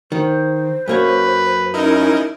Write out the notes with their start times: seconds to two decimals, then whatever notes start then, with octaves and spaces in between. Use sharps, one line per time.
0.12 D#3 C5
0.88 F#2 A#3 B4 C#5
1.74 C#4 D#4 E4 A#4